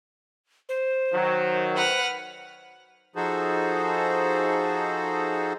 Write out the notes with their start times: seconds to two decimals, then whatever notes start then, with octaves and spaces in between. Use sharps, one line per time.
0.69 C5
1.13 D#3 F#3
1.75 B4 F#5 F6
3.16 F3 D#4 F#4 G#4 A4 C5